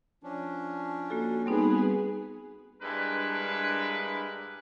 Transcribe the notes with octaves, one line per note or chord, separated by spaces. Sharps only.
F3 C#4 D4
A#3 F#4 A4
G3 B3 C4 D#4 G#4 B4
G2 G#3 D4 E4 A#4 B4